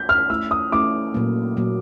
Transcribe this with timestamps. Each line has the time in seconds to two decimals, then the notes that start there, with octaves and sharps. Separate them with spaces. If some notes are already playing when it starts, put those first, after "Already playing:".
Already playing: G6
0.09 F6
0.30 A3 C#4 E4 E6
0.51 D#6
0.72 A3 C#4 E4 D6
1.14 A#2 F#3 A#3
1.57 A#2 F#3 A#3